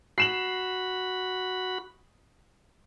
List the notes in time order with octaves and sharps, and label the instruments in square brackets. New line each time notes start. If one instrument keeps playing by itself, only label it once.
[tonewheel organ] F#4 B5 [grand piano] C7 E7 F#7